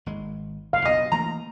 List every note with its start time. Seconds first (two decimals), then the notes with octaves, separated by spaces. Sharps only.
0.06 G#1 G#3
0.73 F#1 A#2 F5
0.85 B1 B2 B3 D#5
1.12 E3 A3 A#3 A#5